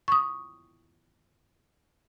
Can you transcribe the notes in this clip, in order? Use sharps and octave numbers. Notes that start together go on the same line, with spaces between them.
C#6 D#6